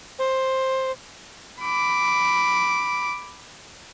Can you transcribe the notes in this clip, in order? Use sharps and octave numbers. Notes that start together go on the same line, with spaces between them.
C5
B5 D6